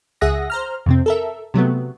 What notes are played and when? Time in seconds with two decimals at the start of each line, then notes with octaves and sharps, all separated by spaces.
0.21 C#2 G#4 E5 F#5 D#6 A#6
0.50 C5 A#5 F6
0.86 F2 C3 C4
1.06 A4 A#4 E5
1.54 C3 F#3 A3 B3